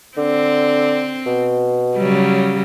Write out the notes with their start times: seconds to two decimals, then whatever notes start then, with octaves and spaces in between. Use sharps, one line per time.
0.18 D3 C4
1.26 B2
1.97 C#3 F#3 G3